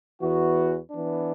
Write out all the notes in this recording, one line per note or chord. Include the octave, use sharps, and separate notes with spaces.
E2 E3 B3 F#4
E3 B3 D4